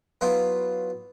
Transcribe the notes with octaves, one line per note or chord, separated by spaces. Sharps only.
F#3 B3 E4 F4